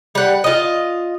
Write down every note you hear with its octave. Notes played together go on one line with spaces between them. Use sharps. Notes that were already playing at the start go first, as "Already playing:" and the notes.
G3 F#5
F4 D#5